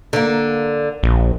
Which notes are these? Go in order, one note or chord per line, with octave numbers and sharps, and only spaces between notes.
D3 A#3
A#1